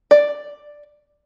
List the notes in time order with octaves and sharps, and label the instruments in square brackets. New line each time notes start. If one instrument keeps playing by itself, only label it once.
[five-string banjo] D5